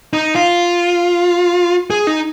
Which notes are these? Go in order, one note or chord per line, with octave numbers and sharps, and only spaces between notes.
D#4
F4
G#4
D#4